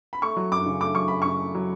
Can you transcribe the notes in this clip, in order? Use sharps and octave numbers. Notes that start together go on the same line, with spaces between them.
B5
A3 C#6
F#3
F#2 D6
C#3
A3 D6
F#3 C#6
F#2 B5
C#3 C#6
A3
F#3